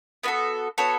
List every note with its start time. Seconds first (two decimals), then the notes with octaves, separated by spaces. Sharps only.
0.23 B3 F#4 A4 B4
0.78 B3 F#4 A4 C#5